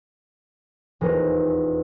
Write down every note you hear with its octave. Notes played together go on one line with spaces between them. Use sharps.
D#1 E2 G#4 A#4 C5